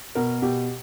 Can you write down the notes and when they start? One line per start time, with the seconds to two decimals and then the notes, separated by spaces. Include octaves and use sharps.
0.15 B2 A#4
0.42 B2 G4